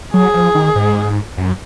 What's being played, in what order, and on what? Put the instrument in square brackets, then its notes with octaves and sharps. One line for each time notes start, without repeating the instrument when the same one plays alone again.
[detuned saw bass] F#3 [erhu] G#4
[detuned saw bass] F3
D#3
G#2
F#2